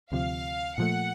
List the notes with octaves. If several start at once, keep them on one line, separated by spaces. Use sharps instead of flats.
D2 C3 F3 F5
A#2 F3 A3 F#5